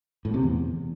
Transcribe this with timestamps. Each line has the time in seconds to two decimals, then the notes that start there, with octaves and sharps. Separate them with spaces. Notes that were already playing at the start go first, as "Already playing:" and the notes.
0.25 A2
0.34 C3
0.43 E2